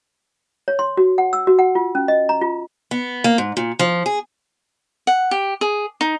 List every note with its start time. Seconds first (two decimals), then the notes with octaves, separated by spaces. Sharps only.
0.68 C#5
0.79 C6
0.97 F#4
1.18 F#5
1.33 E6
1.47 F#4
1.59 F#5
1.75 F4
1.95 C#4
2.08 D#5
2.29 A#5
2.41 F4
2.91 B3
3.24 A#3
3.38 G#2
3.57 A#2
3.79 F3
4.06 G#4
5.07 F#5
5.31 G4
5.61 G#4
6.01 D#4